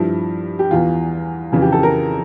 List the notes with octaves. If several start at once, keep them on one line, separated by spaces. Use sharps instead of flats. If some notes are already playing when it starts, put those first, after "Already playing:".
Already playing: G2 F3 E4
G4
E2 E3 F4
F2 C#3 E3 F4
G4
A4
A#4